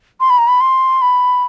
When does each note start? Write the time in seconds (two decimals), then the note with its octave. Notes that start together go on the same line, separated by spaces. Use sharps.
0.20 C6
0.30 B5
0.38 A#5
0.48 B5
0.61 C6
1.02 B5